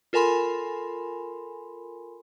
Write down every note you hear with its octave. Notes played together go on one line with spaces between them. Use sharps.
F4 A4 A#4 G#5 B5 C6